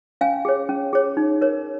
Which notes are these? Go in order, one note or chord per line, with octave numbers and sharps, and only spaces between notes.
C#4 F5 G#5
G#4 C#5
C#4
G#4 C#5
D#4
A#4 C#5